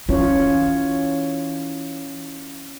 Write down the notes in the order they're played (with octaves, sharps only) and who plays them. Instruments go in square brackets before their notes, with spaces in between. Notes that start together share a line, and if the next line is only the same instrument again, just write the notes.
[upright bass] E3 [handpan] C#4 F4 C#5